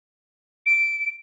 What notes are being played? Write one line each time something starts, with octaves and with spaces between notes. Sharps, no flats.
D7